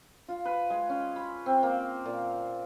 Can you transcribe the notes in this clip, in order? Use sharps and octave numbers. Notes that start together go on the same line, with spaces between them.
F4
B4
G#3
C#4
B5
C4
A#3
A#2